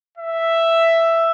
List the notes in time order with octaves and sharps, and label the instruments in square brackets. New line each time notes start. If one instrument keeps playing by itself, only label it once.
[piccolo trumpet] E5